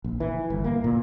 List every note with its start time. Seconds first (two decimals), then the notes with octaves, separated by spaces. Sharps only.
0.04 A#1
0.20 E3
0.50 G1
0.64 A#3
0.84 A#2